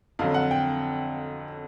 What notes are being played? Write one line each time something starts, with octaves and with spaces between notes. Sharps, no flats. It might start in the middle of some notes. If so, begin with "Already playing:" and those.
F2 D3 F#3 F5
F#5
G5